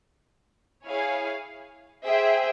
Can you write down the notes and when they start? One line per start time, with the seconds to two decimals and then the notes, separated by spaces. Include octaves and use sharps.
0.86 E4 G#4 C#5 F5 G#5
2.05 G#4 C5 E5 G5